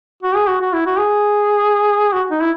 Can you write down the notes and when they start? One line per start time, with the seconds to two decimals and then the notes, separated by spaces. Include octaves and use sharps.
0.22 F#4
0.35 G#4
0.47 F#4
0.61 F#4
0.73 E4
0.86 F#4
0.98 G#4
2.12 F#4
2.31 D#4
2.41 E4